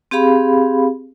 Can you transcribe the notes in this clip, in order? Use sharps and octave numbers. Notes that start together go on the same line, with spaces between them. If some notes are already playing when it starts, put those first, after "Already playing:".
C4 G4 G#4 F5 B5